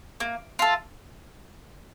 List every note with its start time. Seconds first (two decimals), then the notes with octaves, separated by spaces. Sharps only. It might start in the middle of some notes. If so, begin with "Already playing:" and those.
0.20 A#3
0.59 F4 A4